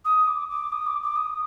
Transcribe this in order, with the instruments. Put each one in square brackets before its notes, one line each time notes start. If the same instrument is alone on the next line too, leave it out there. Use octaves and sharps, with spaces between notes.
[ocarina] D#6
D6
D6
D#6
D6
D6
D#6